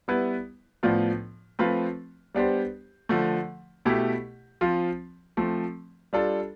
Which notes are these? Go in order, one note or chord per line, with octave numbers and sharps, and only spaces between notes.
G3 B3 E4 B4
A2 F3 B3 D4 F4
F3 A3 C4 F4 B4
G3 B3 D4 G4 C5
D3 F3 A3
B2 A3 E4 G4
F3 C4 F4
F3 A3 C4
G3 D4 F4 A4